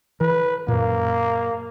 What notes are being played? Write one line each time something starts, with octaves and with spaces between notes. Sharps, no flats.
E3 B4
F#2 A#2 A#3